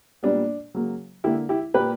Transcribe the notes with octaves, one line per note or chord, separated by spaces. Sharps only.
A#2 G3 B3 D4
C#3 F#3 A#3
D3 A#3 E4 G4
E4 G4
A#2 A#3 G4 B4